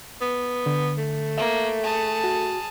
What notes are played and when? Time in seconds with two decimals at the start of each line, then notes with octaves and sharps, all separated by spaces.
0.21 B3
0.66 D3
0.98 A3
1.38 A#3 E5
1.83 G#4 A5
2.24 F#4